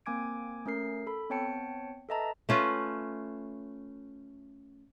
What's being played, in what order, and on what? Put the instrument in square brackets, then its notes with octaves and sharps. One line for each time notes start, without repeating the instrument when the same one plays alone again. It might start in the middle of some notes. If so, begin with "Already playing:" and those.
[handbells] A#3 C4 G#5 D6 G#6 D7
A3 C#4 A#4 C7
A4 B5
B3 C4 C#5 G5 A5 C#7
A4 B4 D#5 E5 A5 A#5
[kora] A3 C#4 F4 B4